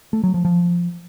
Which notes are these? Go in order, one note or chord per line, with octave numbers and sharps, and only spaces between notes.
A3
F#3
F3
F3